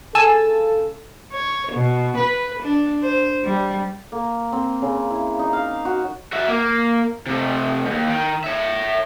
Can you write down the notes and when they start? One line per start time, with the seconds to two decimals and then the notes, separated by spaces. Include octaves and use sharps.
0.15 C#3 A4 G#5 A5 E6
1.32 C#5
1.73 B2
2.17 B4
2.63 D4
3.02 C5
3.44 G3
4.12 A#3
4.53 C4
4.82 C#3
5.11 E4
5.39 D#4
5.53 F5
5.85 F#4
6.32 F#4 E5
6.48 A#3
7.26 C3 A3
7.86 D#2 G#2
8.08 D#3
8.44 C#5 E5